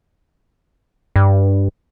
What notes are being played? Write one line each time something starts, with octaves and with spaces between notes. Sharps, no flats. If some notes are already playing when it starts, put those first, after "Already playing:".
G2